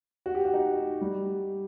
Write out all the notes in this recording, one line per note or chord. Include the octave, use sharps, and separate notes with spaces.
F#4
G4
F#4
D#4
G3